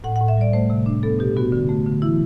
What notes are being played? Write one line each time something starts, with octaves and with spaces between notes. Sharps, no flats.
A2 F#5
F#5
A2
E5
G3 D5
A3 C5
C3
D4
B3 A4
B2 G4
B3 F#4
D3
A3
D3
E3 E4